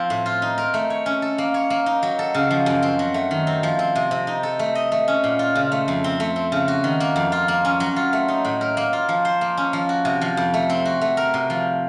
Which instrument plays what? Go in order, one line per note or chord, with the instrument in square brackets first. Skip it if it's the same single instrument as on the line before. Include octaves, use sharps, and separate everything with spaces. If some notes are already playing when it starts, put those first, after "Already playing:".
Already playing: [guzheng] F3 C4 C5
A2
F4
D#4
A#4
A3
C#5
C#4
A4
A#3
C#5
A#3
D#4
F#3
A4
C#3
F3
F#2
C4
F#3
A3
D#3
C4
F3
C4
C3
C3
D#4
A4
A3
D#5
A3
C#4
A#2
F4
C#3
A3
F2
C4
A3
C4
C#3
F#4
D#3
A#3
F2
F4
A#3
C#4
F#3
F4
A3
D#4
A2
A#4
A#3
F4
F3
C5
A#3
C#4
F3
F#4
C3
F3
F2
A3
C4
F#4
A3
A#4
C3
F3